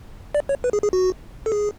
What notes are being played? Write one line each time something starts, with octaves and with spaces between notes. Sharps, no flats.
D5
C#5
B4
G#4
G#4
F#4
A4
G#4